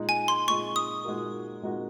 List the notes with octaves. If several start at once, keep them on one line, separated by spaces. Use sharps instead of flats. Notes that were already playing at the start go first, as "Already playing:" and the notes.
Already playing: A#2 G#3 D#4
G#5
C6
A#2 G#3 D#4 C#6
D#6
A#2 G#3 D#4 F#4 A#4
A#2 G#3 D#4 F#4 A#4